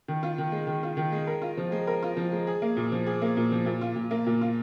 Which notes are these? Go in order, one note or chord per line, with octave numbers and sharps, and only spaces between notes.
D#3
F4
D#3
G#3
D#3
F4
D#3
G#3
A#4
F4
F3
G#3
A#4
F4
F3
G#3
G#4
A#3
A#2
F3
G#4
A#3
A#2
F3
A#2
F4
A#2
A#3
A#2
F4